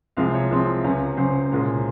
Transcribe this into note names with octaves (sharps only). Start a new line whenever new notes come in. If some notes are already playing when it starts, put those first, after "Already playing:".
C2 C3 F3 G#3 C4 F5
C#5
C2 C3 F3 G#3 C4
C#2 C#3 F#3 C#4
C#2 C#3 F#3 C#4 C5
C2 A#2 G#3 C#4